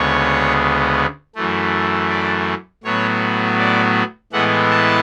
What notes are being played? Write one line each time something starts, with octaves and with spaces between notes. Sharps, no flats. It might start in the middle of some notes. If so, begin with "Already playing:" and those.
Already playing: D2 C#3 G#3 B3 C#5
F#2 E3 A3
D5
A2 F#3 B3 C#5
D5
A2 E3 G#3 B3 F#5
A5